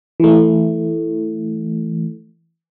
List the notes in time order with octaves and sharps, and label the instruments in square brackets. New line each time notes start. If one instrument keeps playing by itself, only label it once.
[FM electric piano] E3 A3